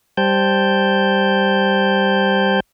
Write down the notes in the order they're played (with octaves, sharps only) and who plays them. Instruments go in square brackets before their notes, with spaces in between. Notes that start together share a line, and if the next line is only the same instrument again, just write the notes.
[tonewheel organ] G3 C5 G5 A5 G6